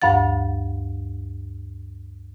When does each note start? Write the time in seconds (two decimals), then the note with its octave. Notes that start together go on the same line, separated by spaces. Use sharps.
0.02 D2 G2 F5 F#5 A6